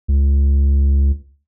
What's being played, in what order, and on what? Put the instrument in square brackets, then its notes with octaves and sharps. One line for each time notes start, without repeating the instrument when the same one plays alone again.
[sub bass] C#2